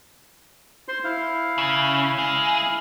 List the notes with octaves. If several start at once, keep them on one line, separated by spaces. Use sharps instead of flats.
C5 C6
E4 F5
C#3
G#3